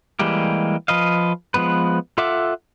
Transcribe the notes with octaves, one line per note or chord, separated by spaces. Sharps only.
E3 G3 G#3 A#3 G4
F3 B4 D#5 F5
F3 G#3 B3 B4
F4 A4 E5 F#5 D6